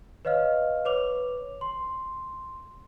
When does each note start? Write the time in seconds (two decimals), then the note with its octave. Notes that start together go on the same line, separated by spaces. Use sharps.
0.25 B4 C#5 D#5 F5 F6
0.85 B4 C#5 D6 F7
1.61 C6